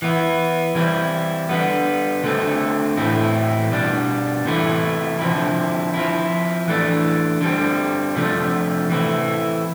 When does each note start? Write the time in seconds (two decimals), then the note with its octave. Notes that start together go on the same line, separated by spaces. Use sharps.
0.02 E3 B3 E4
0.75 E3 G3 C4 E4
1.49 D3 G3 B3
2.24 D3 A3 C4
2.97 A2 E3 A3 C4 E4
3.71 B2 G3 D4
4.45 C3 E3 A3 E4
5.19 D3 F3 C4 E4
5.94 F3 C4 E4
6.68 E3 A3 D4
7.41 D3 G3 C4
8.16 C3 F3 A3 D4
8.90 E3 A3 C4 E4